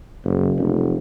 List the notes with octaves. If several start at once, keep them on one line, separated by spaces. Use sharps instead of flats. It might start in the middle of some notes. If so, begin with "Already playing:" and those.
F#1
F1